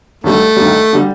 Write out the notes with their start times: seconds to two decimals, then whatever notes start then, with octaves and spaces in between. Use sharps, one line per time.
0.24 D#2 D3 G3 A3
0.57 D#2 D3 G3
0.93 D3 G3